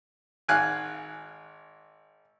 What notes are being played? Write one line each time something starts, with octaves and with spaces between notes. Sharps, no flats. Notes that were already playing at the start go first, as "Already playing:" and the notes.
G#1 F5 G#5 F#6